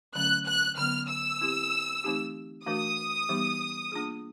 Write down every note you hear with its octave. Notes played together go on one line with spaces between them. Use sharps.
D3 F#3 A3 C#4 F#6
F#6
D3 F#3 B3 F6
E6
C4 E4 G4
E3 A3 C4 D#4 G4
E3 A3 D4 F#4 A#4 D#6
E3 G3 B3 D#4 G4
A#3 D4 F4 G#4